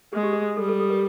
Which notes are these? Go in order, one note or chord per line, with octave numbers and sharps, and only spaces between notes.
G#3 G#4
G4
G#4
G3 A4
A4
A4
A#4